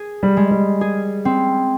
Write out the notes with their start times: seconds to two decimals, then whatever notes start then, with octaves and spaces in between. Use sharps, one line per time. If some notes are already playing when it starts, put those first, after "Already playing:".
Already playing: G#4
0.23 G3
0.37 G#3
0.51 G3
0.81 G#4
1.25 C4